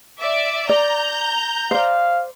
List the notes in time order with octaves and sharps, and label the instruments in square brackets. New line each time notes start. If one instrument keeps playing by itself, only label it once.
[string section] D5 E5
[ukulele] D5 [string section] A#5 G6
[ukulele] C5 D5 [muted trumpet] F5